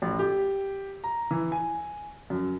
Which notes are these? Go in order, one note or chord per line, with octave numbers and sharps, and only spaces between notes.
A1
G4
A#5
E3
G#5
F#2